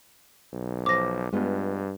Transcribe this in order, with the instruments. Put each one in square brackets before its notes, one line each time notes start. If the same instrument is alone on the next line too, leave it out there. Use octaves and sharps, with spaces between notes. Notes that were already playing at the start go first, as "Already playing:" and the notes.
[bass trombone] B1
[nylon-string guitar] F3 [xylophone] D6 A#6
[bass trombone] G2 [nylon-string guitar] G#3 B3 F4